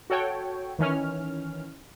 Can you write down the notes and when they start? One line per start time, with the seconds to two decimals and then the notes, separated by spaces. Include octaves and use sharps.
0.10 F#4 A4 C#5 G5
0.79 D#3 E3 C#4 F6